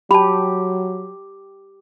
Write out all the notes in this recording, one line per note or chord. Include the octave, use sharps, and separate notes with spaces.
F#3 G4 A5 B5